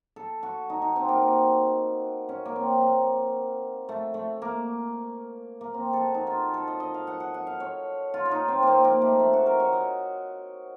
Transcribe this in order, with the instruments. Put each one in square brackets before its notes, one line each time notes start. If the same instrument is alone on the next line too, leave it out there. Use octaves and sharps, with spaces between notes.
[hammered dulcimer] A4
F#4
D#4
D#4
C4
A#3
C4
C#4
A#3
C4
A#3
A3
A3
A#3
A#3
C4
A4
F#4
D#4
F4
A4
D#5
D#5
F5
F#5
F#5
F#5
F5
C#5
F4
F4
D#4
C4
A#3 C4
A#3
A3
A3
F#4
A#4
C#5
D#5